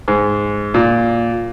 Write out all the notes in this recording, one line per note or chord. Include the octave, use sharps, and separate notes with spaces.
G#2
A#2